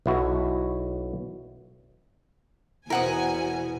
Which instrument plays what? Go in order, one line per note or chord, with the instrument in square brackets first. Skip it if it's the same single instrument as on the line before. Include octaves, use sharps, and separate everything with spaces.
[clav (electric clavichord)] B1 E4 F#4
[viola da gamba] E2 B2 [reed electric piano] E4 C5 [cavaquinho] A#4 F#5 D#6 [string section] G#5